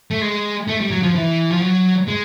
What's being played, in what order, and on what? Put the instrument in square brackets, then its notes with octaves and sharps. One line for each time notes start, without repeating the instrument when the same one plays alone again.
[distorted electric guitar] A3
G#3
A3
G3
F#3
F3
E3
F3
F#3
G#3